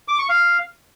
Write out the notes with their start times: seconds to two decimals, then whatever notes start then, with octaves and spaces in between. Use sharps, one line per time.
0.08 D6
0.19 C#6
0.29 F5